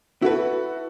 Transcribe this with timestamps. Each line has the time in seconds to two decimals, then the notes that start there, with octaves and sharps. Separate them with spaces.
0.22 E4 F#4 A4 B4